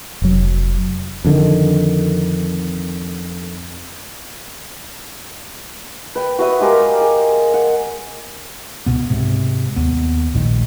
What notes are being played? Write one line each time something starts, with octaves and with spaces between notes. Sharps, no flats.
F1 F#3
F2 D3 D#3
B4 G5
F#4 B4 E5 D#6
G#3 G4 A#4 F5
G#4
F#5
C#2 B2 B3
G#2 C3
D#2 B3
A#1 A2 D#3